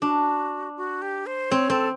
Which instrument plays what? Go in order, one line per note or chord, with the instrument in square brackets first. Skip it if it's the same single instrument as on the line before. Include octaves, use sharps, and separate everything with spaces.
[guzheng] D4 [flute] F#4
[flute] F#4
G4
C5
[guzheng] C4 [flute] C#5
[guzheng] C4 [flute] A4